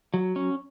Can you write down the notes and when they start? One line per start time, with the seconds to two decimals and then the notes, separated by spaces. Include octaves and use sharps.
0.14 F#3
0.36 C#4